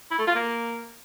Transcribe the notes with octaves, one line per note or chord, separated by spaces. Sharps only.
E4
A3
F4
A#3